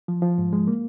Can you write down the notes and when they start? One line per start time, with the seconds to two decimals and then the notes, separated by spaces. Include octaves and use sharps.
0.08 F3
0.22 F3
0.38 G#2
0.53 G#3
0.67 A#3